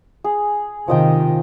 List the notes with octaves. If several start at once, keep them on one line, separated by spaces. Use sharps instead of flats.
G#4
C3 D#3 F3 D#5 G5